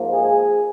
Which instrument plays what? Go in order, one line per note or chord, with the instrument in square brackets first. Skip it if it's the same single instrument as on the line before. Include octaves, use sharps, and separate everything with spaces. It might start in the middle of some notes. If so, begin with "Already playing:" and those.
Already playing: [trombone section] G#2 F3 A#3
G#4